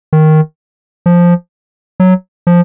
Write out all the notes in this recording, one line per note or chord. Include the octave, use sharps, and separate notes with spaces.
D#3
F3
F#3
F3